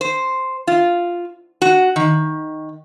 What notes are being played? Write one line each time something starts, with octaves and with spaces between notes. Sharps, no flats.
C5
F4
F#4
D#3